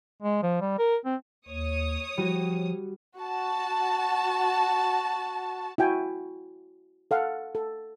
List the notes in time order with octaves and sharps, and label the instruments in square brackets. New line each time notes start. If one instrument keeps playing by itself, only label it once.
[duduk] G#3
F3
G3
A#4
C4
[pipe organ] D#2 [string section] C#5 D#6
[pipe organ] F3 [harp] G3 F#4
[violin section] F#4 A5
[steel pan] E4 F#4 G5 G#5
A4 F5 F#5
A4